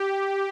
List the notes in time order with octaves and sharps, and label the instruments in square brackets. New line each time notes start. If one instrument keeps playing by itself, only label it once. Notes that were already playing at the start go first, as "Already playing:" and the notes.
Already playing: [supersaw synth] G4